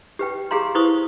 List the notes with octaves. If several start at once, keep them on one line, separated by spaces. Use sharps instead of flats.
G4 B4 G5
G4 G#4 F5 A#5 C6
E4 B4 C5 C#6 D#6